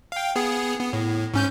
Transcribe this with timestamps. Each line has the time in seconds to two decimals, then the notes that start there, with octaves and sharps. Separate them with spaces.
0.12 F5 G5
0.36 B3 G#4
0.80 B3
0.93 A2
1.34 G#2 C#4 G6